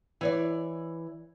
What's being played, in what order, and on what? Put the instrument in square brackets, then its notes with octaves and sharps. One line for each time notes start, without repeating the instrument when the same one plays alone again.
[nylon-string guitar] E3 C#5 D5